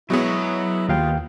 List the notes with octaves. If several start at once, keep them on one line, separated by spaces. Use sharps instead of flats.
B2 F#3 G#3 B3 E4 C#5
D#2 F4 F5 G5